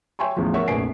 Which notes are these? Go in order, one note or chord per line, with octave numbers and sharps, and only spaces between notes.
C#5 E5 G5 G#5 C6 C#6
A1 E2 E3 F3
A#4 C#5 E5 F#5 C#6
F1 A#1 B4 G#5 C7 D7